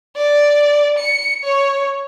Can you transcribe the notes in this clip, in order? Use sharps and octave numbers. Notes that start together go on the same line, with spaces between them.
D5
C#7
C#5